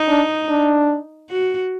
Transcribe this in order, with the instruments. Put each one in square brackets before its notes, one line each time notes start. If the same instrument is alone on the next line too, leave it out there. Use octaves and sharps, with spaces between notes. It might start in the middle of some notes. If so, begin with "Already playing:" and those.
Already playing: [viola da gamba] D#4
[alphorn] D4
D4
[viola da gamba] F#4